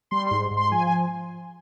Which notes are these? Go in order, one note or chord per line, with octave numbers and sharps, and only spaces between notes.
G3 C6
G#2 C6
G#2
C6
F3 G#5
G#5